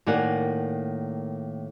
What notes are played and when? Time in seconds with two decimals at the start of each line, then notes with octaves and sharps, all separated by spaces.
0.06 A2 D#3 A#3 D5 F#5 G#5